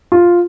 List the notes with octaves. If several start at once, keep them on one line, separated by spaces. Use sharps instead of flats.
F4